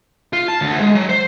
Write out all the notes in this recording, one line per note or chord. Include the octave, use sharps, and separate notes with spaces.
F4
A5
D2
G#3
F#3
C5